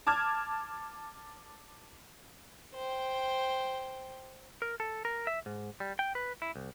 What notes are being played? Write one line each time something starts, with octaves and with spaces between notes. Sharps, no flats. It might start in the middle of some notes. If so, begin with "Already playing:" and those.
A5 D6 F6 G#6
C5 G5
A#4
A4
A#4
E5
G#2
G3
G5
B4
E4
C2